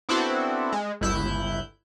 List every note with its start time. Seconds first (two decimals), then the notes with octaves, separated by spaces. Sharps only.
0.09 B3 C4 D4 E4 F#4 A4
0.72 G#3
1.01 G1 C#2 E4 F#6 G6